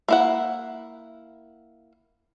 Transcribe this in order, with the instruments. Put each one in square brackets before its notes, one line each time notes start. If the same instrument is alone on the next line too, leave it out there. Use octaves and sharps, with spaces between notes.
[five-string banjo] A#3 E4 F#5